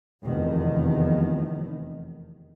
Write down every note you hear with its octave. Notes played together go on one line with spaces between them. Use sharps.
F1 E2 D#3